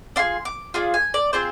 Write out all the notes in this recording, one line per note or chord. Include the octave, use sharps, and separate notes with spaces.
D4 F4 G#4 C6
D6
D4 F4 G#4 D#6
G#5
D5
C4 F4 G#4 C5